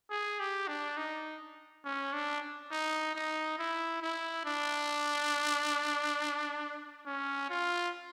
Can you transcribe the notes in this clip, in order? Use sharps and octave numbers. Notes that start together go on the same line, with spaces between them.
G#4
G4
D4
D#4
C#4
D4
D#4
D#4
E4
E4
D4
C#4
F4